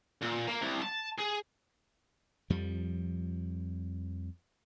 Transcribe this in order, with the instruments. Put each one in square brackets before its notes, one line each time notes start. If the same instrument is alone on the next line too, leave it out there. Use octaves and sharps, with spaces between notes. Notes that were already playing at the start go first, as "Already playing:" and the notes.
[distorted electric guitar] A#2
A#3
C2
A5
G#4
[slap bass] F2 F3 G3